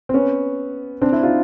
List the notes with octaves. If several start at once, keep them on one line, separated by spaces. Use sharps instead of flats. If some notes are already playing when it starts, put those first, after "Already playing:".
C4
B3 C#4
C4 D4
D4 E4
D#4 F4